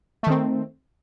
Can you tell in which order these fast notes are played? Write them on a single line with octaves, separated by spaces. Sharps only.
A3 D#3 C4